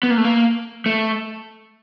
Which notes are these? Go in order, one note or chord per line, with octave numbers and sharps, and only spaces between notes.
B3
A#3
A3
A#3
A3